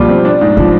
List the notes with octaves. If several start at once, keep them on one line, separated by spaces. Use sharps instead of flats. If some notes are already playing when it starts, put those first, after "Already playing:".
Already playing: B2 F3 G3 A#3 F4
C4
D4
G#2
F3 C4